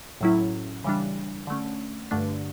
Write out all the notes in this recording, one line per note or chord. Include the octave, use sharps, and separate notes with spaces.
A2 F#3 C#4 E4
C#3 E3 G3 D4
D3 A3 C#4
G2 D3 A3 D4